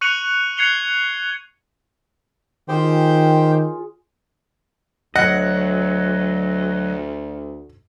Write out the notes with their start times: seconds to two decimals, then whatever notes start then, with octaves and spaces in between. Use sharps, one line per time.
0.01 C#6 F#6 C#7 D#7 F7 F#7
0.57 F#6 G#6 C7 C#7 F7 G7
2.69 D#3 F4 G4 G#4 C5 C#5 G5
5.16 D2 F#3 D#5 F#5